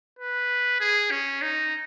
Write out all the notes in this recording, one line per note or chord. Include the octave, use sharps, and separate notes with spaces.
B4
G#4
C#4
D#4